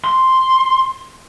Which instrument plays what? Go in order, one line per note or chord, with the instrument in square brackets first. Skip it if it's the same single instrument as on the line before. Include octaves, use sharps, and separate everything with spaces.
[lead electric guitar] C6